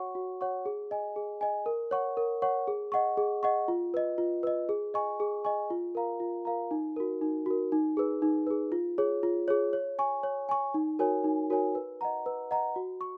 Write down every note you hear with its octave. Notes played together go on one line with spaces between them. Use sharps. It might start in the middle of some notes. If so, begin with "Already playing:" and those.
Already playing: F#4 C#5 F#5 C#6
F#4
C#5 F#5 C#6
G#4
D#5 G#5
G#4
D#5 G#5
A#4
C#5 F#5 C#6
A#4
C#5 F#5 C#6
G#4
D#5 F#5 C#6
G#4
D#5 F#5 C#6
F4
B4 D#5
F4
B4 D#5
G#4
D#5 G#5 C#6
G#4
D#5 G#5 C#6
F4
A#4 F5 A#5
F4
A#4 F5 A#5
D#4
F#4 A#4
D#4
F#4 A#4
D#4
G#4 B4
D#4
G#4 B4
F4
G#4 C#5
F4
G#4 C#5
C#5
G#5 C#6
C#5
G#5 C#6
D#4
F#4 A#4 C#5 G#5
D#4
F#4 A#4 C#5 G#5
B4
D#5 F#5 A#5
B4
D#5 F#5 A#5
F#4
C#6